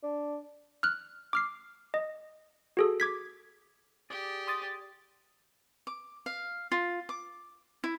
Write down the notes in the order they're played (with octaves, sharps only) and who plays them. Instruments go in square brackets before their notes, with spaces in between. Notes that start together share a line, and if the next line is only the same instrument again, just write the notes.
[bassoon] D4
[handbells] F6 F#6
D6 F6 C7
D#5
F#4 G#4 A4
D6 G#6 B6
[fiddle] G4 [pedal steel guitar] G#4 D5
[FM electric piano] C6 D#6 A6
[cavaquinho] D6
F5
F4
D6
E4